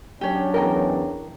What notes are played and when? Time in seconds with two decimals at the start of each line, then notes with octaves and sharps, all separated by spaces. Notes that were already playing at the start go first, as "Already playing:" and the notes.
0.21 F#3 C#4 D4 G4 C#5
0.54 E2 A#4 D#5 G5 A#5